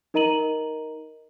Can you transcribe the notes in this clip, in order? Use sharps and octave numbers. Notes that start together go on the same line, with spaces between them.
D#4 A#4 D#5 A#5 D#7 F#7